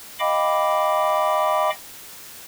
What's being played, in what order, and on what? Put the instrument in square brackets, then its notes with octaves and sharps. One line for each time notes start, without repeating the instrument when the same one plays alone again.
[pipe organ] D#5 F5 G5 B5 D6